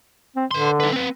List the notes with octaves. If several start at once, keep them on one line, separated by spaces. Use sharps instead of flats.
C4
D3 B4 C6
D#4 B4
C4 B4